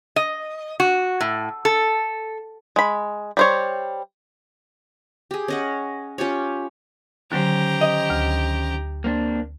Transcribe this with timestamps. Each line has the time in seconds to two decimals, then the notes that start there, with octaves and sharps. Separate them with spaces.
0.16 D#5
0.80 F#4
1.21 A2
1.65 A4
2.76 G#3 B5
3.37 G3 C5 C#5
5.31 G4 G#4
5.48 C#4 D#5 F#5
6.18 C#4 F4 G4 C#5
7.32 D3 D#3 F#3 C#4 G4 C5 A#5
7.81 D#5
8.10 D2
9.04 A#3 C4 D4